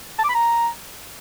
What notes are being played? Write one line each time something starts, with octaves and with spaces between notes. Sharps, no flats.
A5
D6
B5
A#5